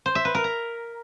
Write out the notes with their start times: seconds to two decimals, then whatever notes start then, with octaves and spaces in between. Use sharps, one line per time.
0.06 C5
0.15 E5
0.25 B4
0.35 A#4
0.44 A#5